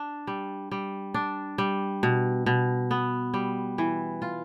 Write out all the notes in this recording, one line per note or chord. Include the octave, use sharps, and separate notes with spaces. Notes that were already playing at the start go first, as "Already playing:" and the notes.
Already playing: D4
G3
G3
D4
G3
B2
B2
B3
G3
E3
F4